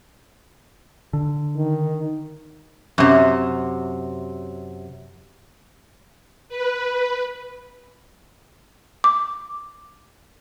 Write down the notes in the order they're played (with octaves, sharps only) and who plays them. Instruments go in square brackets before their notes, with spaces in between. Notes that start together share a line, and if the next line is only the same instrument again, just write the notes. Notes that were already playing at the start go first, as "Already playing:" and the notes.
[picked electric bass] D3
[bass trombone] D#3
[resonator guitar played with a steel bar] F#2 C3
[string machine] B4
[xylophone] D6